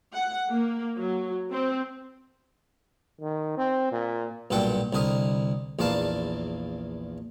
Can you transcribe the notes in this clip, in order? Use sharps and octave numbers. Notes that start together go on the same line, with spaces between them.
F#5
A#3
F#3
C4
D#3
C4
A#2
B1 G2 A#2 A4 F#5 G5
C2 D3 A#4 D#5
A#1 E2 A#3 D5 F5 A5